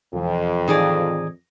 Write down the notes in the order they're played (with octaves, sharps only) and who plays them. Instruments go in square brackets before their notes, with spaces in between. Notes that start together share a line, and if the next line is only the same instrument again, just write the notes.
[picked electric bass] E1 E3 [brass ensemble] F2
[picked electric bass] A2 D#3 E3 [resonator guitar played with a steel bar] D#4 G#4 D5